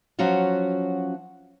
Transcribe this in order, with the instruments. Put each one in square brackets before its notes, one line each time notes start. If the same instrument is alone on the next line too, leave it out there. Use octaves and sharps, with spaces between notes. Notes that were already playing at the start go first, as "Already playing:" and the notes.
[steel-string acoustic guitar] F3 F#3 C#4 F#4